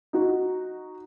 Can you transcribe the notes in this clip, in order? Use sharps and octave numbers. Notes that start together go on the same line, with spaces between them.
D#4 F#4